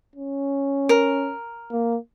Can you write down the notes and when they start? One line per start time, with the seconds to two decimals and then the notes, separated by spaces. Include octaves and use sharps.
0.16 C#4
0.89 A#4
1.72 A#3